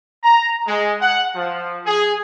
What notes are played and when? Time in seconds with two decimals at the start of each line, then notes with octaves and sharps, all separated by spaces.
0.23 A#5
0.67 G#3
1.01 F#5
1.35 F3
1.86 G#4